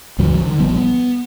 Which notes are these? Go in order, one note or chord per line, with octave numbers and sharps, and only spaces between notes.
C#2 G2 E3 F#3
D3 D#3
A#1 F3 G3 B3
B3